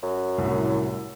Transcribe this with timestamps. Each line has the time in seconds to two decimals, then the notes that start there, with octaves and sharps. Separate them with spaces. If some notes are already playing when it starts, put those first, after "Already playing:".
0.03 F#2
0.38 C2 A2